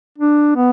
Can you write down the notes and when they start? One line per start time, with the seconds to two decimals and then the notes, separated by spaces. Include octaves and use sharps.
0.18 D4
0.56 B3